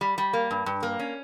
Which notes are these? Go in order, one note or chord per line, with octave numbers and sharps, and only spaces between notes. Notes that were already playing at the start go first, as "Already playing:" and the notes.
G3
G3
A#3
G2
G2
A#3
C#4